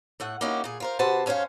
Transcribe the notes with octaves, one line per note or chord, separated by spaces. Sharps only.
A2 A3 F#5
A#3 C#4 D#4 E4 F#4 G4
A#2 G#4
F4 A#4 C5
C3 F#4 B4 C5 A5
F#2 C#4 C5 C#5 F5